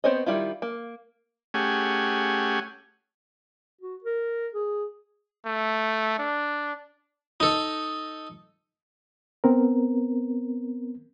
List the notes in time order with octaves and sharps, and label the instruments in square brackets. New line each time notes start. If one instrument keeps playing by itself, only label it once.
[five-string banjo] B3 C4 C5 C#5 D#5
D#3 F#3 G3 E4 F4
A#3
[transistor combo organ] A3 C#4 G4 G#4 F#5 G#5
[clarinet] F#4
A#4
G#4
[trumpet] A3
D4
[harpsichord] D#4 A4
[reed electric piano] B3 C4 A#4